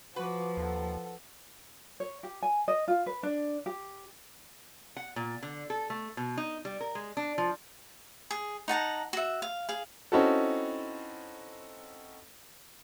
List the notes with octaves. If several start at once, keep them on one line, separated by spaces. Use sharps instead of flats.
F3 F#4 B4 D6
D#2 A4 F#5
C#5
G4
G#5
D#5
F4
B4
D4
G4
F#5
A#2
D3
A4
A3
B2
D#4
G3
A#4
G#3
D4
F3
G#4
D#4 F#5 A5 A#5
F#4 E5
F5
G#4 F5
C4 C#4 D#4 E4 F#4 A4